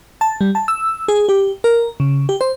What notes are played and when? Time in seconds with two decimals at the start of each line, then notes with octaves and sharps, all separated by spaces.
0.21 A5
0.41 G3
0.55 A5
0.68 E6
1.08 G#4
1.29 G4
1.64 A#4
2.00 C#3
2.29 G4
2.41 C5